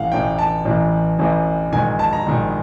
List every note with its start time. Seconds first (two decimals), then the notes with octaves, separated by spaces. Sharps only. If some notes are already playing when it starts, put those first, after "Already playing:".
Already playing: A1 A2 E3 F5 F#5
0.12 A1 A2 E3 G5
0.39 A5
0.65 A1 A2 E3
1.19 A1 A2 E3
1.72 A#1 G#2 D#3 G#5
1.99 A5
2.13 A#5
2.26 A#1 G#2 D#3